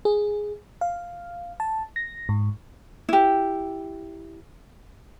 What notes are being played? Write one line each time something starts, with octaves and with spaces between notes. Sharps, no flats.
G#4
F5
A5
A#6
G#2
E4 G4